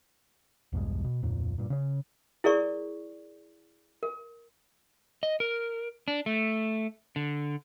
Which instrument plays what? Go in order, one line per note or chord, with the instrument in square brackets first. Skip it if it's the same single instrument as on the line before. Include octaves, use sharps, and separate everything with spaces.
[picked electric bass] B1 E2 G2 G#3
B2
D1 F2 A#2
G2 A#2
C#3 C#4
[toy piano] E4 G#4 A#4 D5 C#6
A#4
[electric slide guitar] D#5
A#4
D4
A3
D3